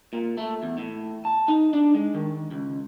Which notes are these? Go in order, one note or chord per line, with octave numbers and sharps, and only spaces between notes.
A#2
A3
E2
A2
A5
D#4
D4
G#3
D#3
C#2